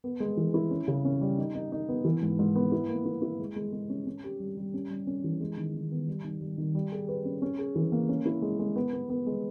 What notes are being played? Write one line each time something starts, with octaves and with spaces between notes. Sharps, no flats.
B3
G#3
E3
E4
C#4
C#3
C#4
G3
D#4
D#4
D#4
B3
E3
G#2
G#2
B3
E4
A#3
E4
E4
G#3
G#3
G#3
C#4
C#4
G4
G3
G3
C#4
G3
C#4
E3
G#3
D#3
D#3
B3
G3
D#3
G3
D#3
G3
G#4
B4
C#4
C#4
G#4
E3
A#3
C#4
E4
G#3
G#3
B3
B3
B3
G#3